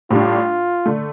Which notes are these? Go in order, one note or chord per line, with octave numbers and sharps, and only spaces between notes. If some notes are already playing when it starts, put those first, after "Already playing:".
A2 G3 D4 F4
D3 A3